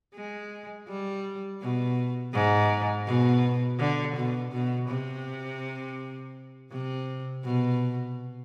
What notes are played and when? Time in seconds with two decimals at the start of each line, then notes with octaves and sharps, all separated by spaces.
0.15 G#3
0.88 G3
1.61 B2
2.33 G#2
3.06 B2
3.79 D3
4.16 B2
4.52 B2
4.89 C3
6.71 C3
7.44 B2